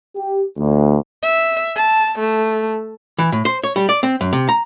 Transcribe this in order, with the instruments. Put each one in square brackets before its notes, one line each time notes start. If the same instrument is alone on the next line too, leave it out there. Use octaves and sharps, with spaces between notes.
[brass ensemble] G4
D2
[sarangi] E5
A5
A3
[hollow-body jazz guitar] E3
A2
C5
C#5
G3
D5
C4
F#2
C3
A#5